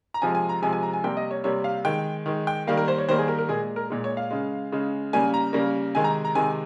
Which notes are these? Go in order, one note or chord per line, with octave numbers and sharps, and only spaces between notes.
A#5
C3 F3 G#3 G#5
G#5
A#5
C3 F3 G#3 G#5
G#5
A#5
G#5
C3 G3 A#3 G5
D#5
C#5
C3 G3 A#3 C#5
F5
D#3 G#3 G5
D#3 G#3
G5
D#3 G3 A#3 F5
A#4
C5
C#5
D#3 G3 A#3 C5
G#4
A#4
A#4
A#2 G#3 G#4
A#4
A#2 G#3
C#5
F5
C#3 G#3
C#3 G#3
C#3 G3 A#3 G#5
A#5
C#3 G3 A#3
C3 D#3 G#3 G#5
A#5
A#5
C3 D#3 G#3 G#5